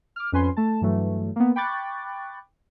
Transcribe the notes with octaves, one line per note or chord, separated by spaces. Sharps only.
D6 F6
F2 C#4 B4 G#5 C6
A3 A5
G2 E3 F#3 A3
A#3 B3
G5 B5 C#6 D6 F#6 A6